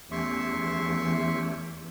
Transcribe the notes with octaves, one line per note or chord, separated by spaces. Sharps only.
E2 A3 C#4 G4 E5 C6 C#6